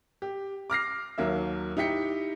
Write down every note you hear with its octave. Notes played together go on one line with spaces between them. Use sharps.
G4
D6 F6 A#6 C7
D#2 F#3 A#3 E5
D#4 E4 G4 B6 C#7